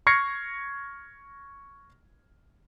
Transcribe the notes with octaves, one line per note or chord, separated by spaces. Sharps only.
C#6 F6 G#6 A#6 C7 C#7